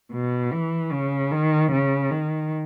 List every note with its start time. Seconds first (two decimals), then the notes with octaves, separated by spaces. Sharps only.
0.13 B2
0.53 E3
0.92 C#3
1.32 D#3
1.72 C#3
2.11 D#3